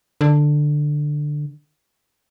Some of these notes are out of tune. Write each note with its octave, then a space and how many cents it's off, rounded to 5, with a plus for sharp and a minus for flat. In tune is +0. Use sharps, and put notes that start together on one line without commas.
D3 +10